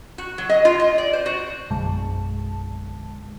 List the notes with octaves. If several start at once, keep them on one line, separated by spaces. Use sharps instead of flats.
F#4
F#3
D#5
F4
D#5
D5
C5
F#4
A#1 F#2 B2 D3 G#3 A5